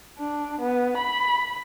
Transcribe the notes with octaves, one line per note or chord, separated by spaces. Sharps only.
D4
B3
B5